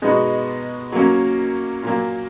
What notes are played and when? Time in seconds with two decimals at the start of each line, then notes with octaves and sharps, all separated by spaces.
0.02 B2 G#3 B3 D#4 F#4
0.92 F#3 A#3 C#4
1.83 A#2 F#3 A#3